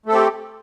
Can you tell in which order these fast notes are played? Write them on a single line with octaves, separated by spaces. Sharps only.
A3 A4 C4 G4